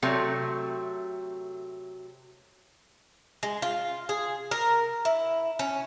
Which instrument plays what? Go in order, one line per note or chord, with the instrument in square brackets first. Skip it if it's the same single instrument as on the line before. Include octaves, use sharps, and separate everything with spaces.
[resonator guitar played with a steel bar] C3 F#3 A3
[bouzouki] G#3
F4
G#4
A#4
E4
C#4